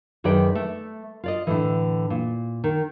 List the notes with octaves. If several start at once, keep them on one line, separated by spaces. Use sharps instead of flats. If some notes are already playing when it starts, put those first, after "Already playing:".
F#2 D#3 G#4 B4 D5 G5
A3
F4 D5 D#5
A2 D3 E3
A#2
D#3